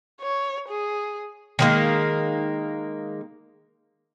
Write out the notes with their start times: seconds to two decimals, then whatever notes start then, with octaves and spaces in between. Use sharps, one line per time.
0.21 C#5
0.68 G#4
1.59 D#3 G#3 A#3